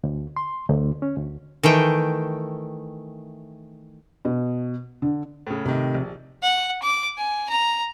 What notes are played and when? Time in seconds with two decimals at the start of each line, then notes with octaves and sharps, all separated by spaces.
0.04 D2
0.36 C6
0.69 D2
1.02 C#4
1.17 D2
1.63 D#3 E3 A3 G5
4.25 B2
5.02 D3
5.47 A2 C#3
5.66 A2 C3 D#3
5.94 A#1
6.42 F#5
6.82 D6
7.18 G#5
7.49 A#5